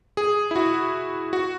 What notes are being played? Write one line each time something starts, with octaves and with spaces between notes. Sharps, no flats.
G#4
E4
F#4
F#4